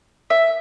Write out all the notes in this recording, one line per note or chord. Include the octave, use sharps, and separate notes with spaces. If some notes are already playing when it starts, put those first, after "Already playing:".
E5